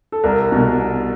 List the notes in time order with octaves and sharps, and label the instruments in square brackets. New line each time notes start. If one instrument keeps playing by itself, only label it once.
[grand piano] A4
C2 A#4
B2